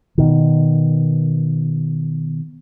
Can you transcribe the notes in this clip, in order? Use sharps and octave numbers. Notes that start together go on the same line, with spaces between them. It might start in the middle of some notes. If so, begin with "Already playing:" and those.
B2 D#3